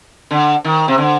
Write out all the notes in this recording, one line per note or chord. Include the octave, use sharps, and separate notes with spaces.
D3
D#3
C3
D3